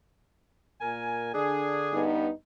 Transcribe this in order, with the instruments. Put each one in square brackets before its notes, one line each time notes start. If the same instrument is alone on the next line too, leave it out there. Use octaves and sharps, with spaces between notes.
[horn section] A#2 A#4 G#5
D3 D4 G#4
[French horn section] G2 B3 D#4